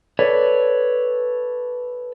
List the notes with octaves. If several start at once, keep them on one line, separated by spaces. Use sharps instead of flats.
A4 B4 C#5 D5